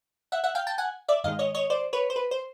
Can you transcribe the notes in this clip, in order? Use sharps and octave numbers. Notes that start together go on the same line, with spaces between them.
E5 F#5
E5 F#5
F5 G5
G5 A5
F#5 G#5
D5 E5
G#2 D#3 G#3 D#5 F5
C#5 D#5
C#5 D#5
C5 D5
B4 C#5
C5
B4
C5